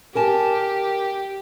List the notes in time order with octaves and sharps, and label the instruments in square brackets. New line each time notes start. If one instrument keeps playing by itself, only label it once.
[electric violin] G4 [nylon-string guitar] A#4 G#5 A5